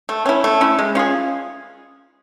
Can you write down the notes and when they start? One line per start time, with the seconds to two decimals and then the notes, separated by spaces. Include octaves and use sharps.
0.09 A3
0.26 C#4 E4
0.44 A3
0.61 C#4 E4
0.79 G#3
0.95 C#4 F4 G#4